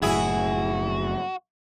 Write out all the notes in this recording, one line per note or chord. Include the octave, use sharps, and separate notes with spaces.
F#1 F#2 A2 E4 F#4 G#4